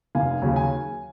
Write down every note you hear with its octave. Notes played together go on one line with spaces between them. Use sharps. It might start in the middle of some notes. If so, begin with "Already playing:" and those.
F1 F5 G#5
D#2 C#3 F#3 C#4
G#5